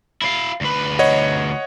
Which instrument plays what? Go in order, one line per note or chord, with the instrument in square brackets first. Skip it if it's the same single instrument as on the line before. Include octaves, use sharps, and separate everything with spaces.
[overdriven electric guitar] E4 F5
D2 B4
[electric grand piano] C#5 D#5 F#5